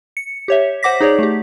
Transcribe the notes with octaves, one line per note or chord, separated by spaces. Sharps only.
C#7
G4 C#5 E5
C5 F#5 D6 A#6 B6
D#4 G#4 C#5 D5
A3 G4